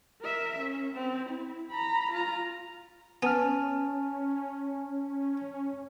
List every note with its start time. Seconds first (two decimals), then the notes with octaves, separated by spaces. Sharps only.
0.22 A#4 E5
0.59 C#4
0.94 C4
1.30 E4
1.71 A#5 B5
2.12 F4 A#5
3.23 B3 C#4 G#5 A5 F6